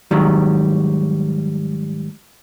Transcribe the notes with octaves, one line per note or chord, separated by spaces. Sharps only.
G#2 D#3 F#3 G3